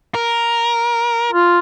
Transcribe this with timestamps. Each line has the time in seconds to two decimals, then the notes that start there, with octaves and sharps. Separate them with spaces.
0.15 A#4
1.32 F4